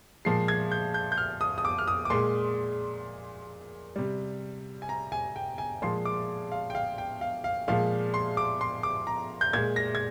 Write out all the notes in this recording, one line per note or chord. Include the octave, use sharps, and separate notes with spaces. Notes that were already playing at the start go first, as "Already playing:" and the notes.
A#2 F3 G#3 C7
G#6
G6
G6
G6
F6
D#6
D#6
D6
F6
D#6
D6
A#2 G#3 C6
C3 G3
G#5
A#5
G#5
G5
G#5
A#2 F3 G#3 C6
D6
F5
G5
F5
G5
F5
F5
A#2 F3 G#3 F5
C6
D6
C6
D6
A#5
G6
A#2 G#3 G#6
A#6
G#6